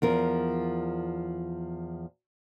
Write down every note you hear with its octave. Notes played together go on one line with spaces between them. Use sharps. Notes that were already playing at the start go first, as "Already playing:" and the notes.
E2 F3 A#4